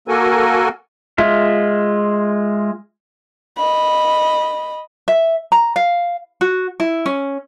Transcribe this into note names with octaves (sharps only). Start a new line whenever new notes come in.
A#3 F#4 A4 A#4 G#5
G#3 F4 E5
D#5 B5
E5
A#5
F5
F#4
E4
C#4